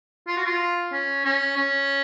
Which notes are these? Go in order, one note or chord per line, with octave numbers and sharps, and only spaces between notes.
F4
F#4
F4
C#4
C#4
C#4